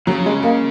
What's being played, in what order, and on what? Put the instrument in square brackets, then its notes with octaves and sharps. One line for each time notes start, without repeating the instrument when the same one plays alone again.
[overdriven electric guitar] C#3 [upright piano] F#3
[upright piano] G#3
A#3